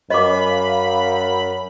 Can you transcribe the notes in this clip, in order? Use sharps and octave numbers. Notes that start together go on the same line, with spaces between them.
F#2 D#5 F5 B5 D6